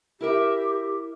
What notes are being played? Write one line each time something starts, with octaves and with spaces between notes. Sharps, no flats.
E4 G4 A#4 E5